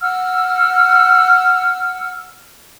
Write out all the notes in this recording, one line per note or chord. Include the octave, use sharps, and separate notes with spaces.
F#5 E6 F6